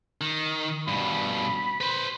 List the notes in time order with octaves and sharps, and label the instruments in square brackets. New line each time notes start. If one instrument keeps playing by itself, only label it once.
[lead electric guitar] D#3
[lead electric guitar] G2 B2 [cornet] B5
[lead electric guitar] B4 C5